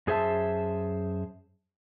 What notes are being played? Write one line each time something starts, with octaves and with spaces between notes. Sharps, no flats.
F#2 G#4 C5 E5 A5